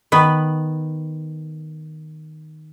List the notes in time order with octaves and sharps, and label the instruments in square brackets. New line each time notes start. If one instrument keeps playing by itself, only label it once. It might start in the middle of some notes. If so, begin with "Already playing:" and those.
[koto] D#3 B3 B4